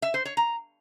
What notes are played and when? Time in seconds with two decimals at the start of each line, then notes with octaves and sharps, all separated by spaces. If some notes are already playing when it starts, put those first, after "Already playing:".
0.02 E5
0.14 C5
0.25 C#5
0.37 A#5